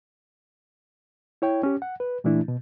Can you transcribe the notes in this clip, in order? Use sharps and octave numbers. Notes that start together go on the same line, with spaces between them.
E4 C#5 G5
C#4 G4
F#5
B4
A#2 E3 A3 D4 E4
B2